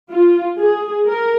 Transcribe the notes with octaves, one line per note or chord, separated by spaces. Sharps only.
F4
G#4
A#4